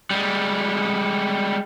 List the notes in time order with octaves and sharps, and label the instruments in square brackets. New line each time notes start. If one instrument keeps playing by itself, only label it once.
[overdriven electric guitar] G3 G#3